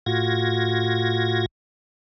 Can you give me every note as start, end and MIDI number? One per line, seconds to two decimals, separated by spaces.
0.06 1.46 45
0.06 1.46 65
0.06 1.46 66
0.06 1.46 92
0.06 1.46 94